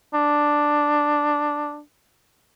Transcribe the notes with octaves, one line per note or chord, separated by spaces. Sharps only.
D4